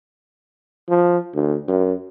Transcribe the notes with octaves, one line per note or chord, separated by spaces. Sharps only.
F3
D2
F#2